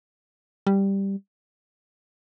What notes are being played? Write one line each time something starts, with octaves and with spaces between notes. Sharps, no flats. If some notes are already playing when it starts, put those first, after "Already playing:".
G3